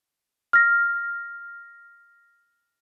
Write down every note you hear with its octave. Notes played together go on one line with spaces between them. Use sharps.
F6 A#6